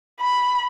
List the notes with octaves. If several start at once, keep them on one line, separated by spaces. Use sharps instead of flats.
B5